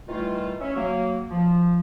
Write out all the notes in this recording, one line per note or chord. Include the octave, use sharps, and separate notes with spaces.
D#3 E3 G3 A3 E4 F4
C#4 E5
F#3 A#3
F3